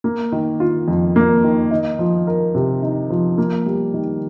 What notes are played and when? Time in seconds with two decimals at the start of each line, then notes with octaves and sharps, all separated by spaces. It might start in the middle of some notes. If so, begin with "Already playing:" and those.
0.04 A#3
0.32 D#3
0.60 F4
0.88 F2
1.16 A#3
1.44 D#3
1.71 D#4
1.99 F3
2.27 A#4
2.55 C3
2.82 D#4
3.10 F3
3.38 A#3
3.66 G3
3.94 D#3